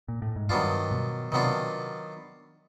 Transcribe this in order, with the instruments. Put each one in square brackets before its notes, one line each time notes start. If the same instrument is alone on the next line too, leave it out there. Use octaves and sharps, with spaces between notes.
[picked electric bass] A#2
A2
G#2
[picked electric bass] G2 [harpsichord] D#3 F#3 B3 D4 F4
[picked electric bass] B2
[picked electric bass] C3 [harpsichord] D#3 F#3 B3 D4 F4